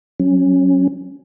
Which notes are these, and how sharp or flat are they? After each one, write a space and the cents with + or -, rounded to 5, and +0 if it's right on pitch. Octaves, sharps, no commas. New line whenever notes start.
F#3 +0 C#4 -10